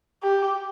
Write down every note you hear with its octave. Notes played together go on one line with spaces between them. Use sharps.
G4